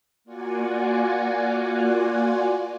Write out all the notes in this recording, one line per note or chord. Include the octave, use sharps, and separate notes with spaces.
A#3 F4 F#4 D5 F#5 G#5